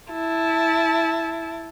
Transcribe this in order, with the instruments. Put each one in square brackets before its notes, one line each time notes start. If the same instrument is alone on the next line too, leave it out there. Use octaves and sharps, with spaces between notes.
[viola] E4 A5